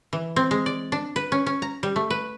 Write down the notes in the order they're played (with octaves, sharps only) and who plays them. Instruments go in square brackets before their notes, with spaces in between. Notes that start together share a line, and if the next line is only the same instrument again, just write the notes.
[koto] E3
C4
G#3
D5
D4
B4
C#4
C#4
A#5
G3
A3
B4